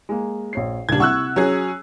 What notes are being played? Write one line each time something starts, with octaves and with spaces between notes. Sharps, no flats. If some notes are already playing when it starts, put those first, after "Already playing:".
G#3 A#3
A#1 C#5 C7
D#1 C#2 G3 D4 G#6
C3 E4 F#5 C#6 E6 F#6
F#3 C#4 G#4